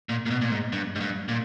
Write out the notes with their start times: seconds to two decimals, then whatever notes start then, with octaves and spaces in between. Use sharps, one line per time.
0.09 A#2
0.26 A#2
0.30 B2
0.41 A#2
0.51 G#2
0.73 G2
0.96 G#2
1.01 G2
1.28 A#2